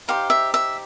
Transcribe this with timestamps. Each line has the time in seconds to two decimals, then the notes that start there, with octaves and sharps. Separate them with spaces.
0.08 D#4 G4 C5 F5
0.30 E5
0.54 E5